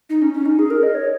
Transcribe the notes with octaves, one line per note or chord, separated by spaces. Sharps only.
D#4
C#4
C#4
D#4
G#4
A#4
D#5
C#5